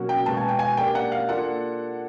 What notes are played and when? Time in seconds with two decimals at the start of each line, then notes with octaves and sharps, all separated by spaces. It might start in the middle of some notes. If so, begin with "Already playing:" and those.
Already playing: B2 F#3 A#3 C#4 F#4
0.09 G5
0.26 B2 G#3 B3 A5
0.37 G#5
0.48 G5
0.59 G#5
0.77 A#3 D4 G4 A#4 G5
0.95 F#5
1.12 F5
1.29 A#3 D4 F4 A4 F#5